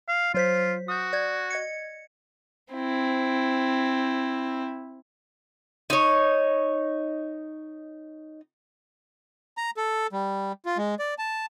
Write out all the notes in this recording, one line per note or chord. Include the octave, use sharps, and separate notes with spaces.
F5
F#3 F4 C5 B6
F#4 D#6 G6
D5 G6 G#6
D#5 G#6 C#7
C4 E4
D#4 C#5
A#5
A4
G3
F4
G#3
D5
A5